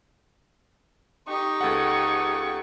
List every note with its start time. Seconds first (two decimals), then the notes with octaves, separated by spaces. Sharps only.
1.28 D#4 G4 C#6
1.61 C#2 A4 F#5